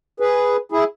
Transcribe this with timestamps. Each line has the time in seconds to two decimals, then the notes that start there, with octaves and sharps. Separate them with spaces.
0.20 G#4 B4
0.72 E4 G#4